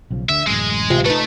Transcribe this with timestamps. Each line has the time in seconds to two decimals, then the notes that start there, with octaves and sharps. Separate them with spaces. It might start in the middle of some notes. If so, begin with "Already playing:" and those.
0.11 B1 C#3 F3
0.29 D2 D3 E5
0.47 D1 A1 F#2 G#3
0.90 C3 F4
1.06 A3 D#4 B4